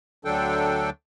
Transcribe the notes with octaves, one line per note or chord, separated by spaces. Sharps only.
D2 D3 F#3 D4 A4 G5